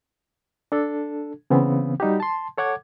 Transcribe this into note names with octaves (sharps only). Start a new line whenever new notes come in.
D4 A4
C#3 E3 B3 C4
G3 D#4 F#4 G4
A5 C6
A4 C#5 F#5 D6 G#6